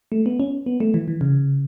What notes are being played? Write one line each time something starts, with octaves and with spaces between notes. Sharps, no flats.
A3
B3
C#4
B3
A3
E3
E3
C#3